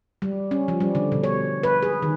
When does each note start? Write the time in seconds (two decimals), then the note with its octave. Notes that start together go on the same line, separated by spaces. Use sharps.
0.22 G3
0.51 C#4
0.68 F3
0.80 G3
0.95 D3
1.12 B2
1.24 C#5
1.63 B4
1.82 G#4
2.02 D#3